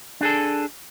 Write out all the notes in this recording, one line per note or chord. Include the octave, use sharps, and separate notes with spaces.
D4 G#4 A4